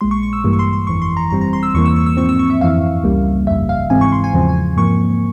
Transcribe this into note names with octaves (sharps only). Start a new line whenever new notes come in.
A#1 A#2 G#3 C6
C#6
C#6
E6
G2 E3 G3 A#3
C#6
C6
C6
G1 F2 E3 C#6
C6
A#5
G1 G2 G3 C4 A#5
A#5
C6
E6
E2 E3 A#3 C#6
E6
C#6
E6
G#2 F3 C4 C#6
E6
C#6
E5
G1 F2 E3 F5
C#2 C#3 G3 A#3
G1 F2 C#3 E5
F5
G#2 E3 G#3 C4 G#5
C#6
C6
G#5
E2 C#3 F3 C4
G#5
G#2 F3 A#3 C#6